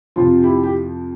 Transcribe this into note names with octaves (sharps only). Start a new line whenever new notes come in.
F2 C3 F3 F4
E4 G4
G4